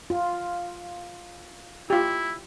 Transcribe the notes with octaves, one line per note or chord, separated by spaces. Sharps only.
F4
E4 F4 G4